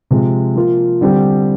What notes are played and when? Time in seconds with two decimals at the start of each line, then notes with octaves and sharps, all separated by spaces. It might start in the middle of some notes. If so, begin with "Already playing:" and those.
0.11 C3 F3 G#3
0.56 F3 A#3 F4
1.01 D3 G3 C4 G4